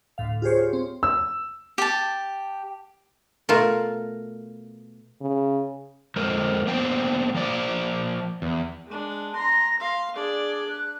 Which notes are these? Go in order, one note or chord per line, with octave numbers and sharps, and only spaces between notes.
D2 A2 F5
F4 G4 G#4 C5 C#5
C4
E6
G4 A5
B2 A3 F4 A#4
C#3
F2 G#3 A#4 C5
A#3 B3 D4 C5 G5
F3 A#3 D5
E2
G#3 D4
A#5 C6 A#6
F5 C6
D4 G#4 D5
F#6